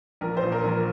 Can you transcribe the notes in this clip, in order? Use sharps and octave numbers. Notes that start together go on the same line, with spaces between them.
A#1 A#4
C5
A#2
A#4
A#1 A#4